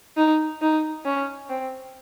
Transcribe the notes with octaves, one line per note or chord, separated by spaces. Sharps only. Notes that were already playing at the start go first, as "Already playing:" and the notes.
D#4
D#4
C#4
C4